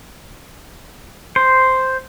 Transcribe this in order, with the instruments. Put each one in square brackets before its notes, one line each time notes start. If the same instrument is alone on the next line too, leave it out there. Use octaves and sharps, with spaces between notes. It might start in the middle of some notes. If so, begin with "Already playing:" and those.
[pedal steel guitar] C5